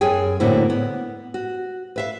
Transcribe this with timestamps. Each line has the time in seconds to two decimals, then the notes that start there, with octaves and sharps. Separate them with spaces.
0.01 F#2 G#4 G5 G#5
0.40 A2 D3 A#3 C4 E4 F#4
0.70 B3
1.34 F#4
1.96 B4 E5 F5